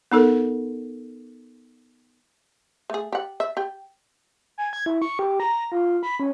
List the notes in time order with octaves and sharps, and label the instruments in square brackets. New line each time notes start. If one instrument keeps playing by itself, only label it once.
[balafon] B3 D#4 A4 A#4
[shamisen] A3 G#4
G4 F#5
E5
G4 G5
[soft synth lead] G#5
G#6
E4
C#6
G4
A#5
F4
B5
C#4